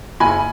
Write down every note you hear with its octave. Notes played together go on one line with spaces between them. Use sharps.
F#1 G#5 B5